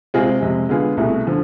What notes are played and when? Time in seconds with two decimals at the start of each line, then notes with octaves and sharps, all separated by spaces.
0.14 C3 G#3 C4 F4 G#4
0.41 F2 C3 G#3
0.69 D3 G#3 B3 F4 G#4
0.97 C2 B2 A3 E4 G#4
1.27 D3 F3